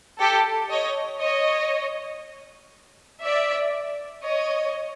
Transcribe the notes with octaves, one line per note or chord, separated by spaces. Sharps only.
G4 A4
C#5 D#5
C#5 D#5
D5 E5
C#5 D#5